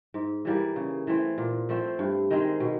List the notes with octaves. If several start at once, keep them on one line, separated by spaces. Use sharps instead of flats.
G#2
E3 G3 A#3
C#3
E3 A3 C4
A#2
F3 A3 C4
G2
D#3 G#3 C4
B2